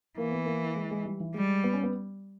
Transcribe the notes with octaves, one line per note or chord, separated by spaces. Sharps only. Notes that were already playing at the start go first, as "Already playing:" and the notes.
E3 A#3
B3
A#3
G#3
G#3
G3
E3
G3 G#3
B3
C#4
B3